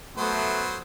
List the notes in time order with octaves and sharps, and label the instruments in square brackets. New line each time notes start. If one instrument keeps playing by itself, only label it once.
[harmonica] F#3 C5 [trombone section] A3 [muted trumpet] B3